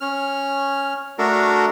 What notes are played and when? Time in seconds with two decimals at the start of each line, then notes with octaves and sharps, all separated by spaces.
0.01 C#4 F6
1.18 A3 D4 F#4 A4 A#4